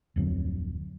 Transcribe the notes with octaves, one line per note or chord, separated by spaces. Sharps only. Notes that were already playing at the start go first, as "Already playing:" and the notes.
D1 F2 D3 F#3